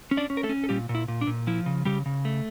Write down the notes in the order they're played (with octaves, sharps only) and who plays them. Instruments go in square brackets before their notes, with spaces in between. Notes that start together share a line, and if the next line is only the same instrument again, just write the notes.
[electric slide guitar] C#4
D4 D5
C#4
A#4
A3 A4
C#4
A4
A#2 G3 G4
A#2
E4
A#2
D4
A#2
F3 E4
C#3
C#3 G3 G4
C#3
A3